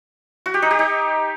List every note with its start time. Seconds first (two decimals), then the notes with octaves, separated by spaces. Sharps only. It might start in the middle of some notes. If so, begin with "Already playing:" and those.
0.46 F#4
0.54 G4
0.62 D#4
0.71 G4
0.79 D#4